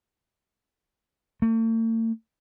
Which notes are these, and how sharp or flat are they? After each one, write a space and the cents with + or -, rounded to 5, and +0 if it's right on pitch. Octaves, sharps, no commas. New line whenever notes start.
A3 +45